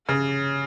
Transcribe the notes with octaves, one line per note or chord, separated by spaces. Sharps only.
C#3